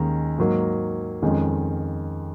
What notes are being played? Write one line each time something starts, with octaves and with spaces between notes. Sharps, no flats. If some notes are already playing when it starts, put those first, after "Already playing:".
Already playing: D#2 D#3 G#3 C#4 A#5
G#2 F#3 A#3
F2 D#3 G#3 C#4